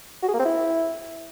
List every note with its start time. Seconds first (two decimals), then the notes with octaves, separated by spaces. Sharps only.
0.22 F#4
0.28 G#4
0.34 A#3
0.39 C4
0.45 E4